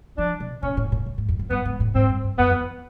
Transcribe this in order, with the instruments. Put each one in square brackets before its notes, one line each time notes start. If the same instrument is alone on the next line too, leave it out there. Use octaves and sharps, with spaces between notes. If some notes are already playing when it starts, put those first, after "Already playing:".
[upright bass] F3 [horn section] D4
[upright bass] B2
[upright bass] A#2 [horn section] C#4
[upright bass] A2
A#2
A2
G#2
F2
F2
[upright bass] G2 [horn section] B3
[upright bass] G#2
A2
[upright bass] G#2 [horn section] C4
[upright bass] G2
G2
[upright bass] F#2 [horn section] B3
[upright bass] F2
F2